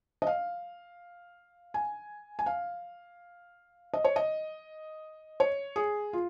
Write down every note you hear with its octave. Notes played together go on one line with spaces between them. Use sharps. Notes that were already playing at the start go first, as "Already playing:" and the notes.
D#5
F5
G#5
G#5
F5
D#5
C#5
D#5
C#5
G#4
F4